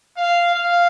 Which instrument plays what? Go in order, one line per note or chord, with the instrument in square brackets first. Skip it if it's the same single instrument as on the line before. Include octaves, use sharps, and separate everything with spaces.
[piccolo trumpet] F5
F5